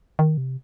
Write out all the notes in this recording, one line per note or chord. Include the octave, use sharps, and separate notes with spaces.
D#3
C3